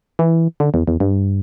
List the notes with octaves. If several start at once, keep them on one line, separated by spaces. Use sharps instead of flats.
E3
D3
E2
E2
G2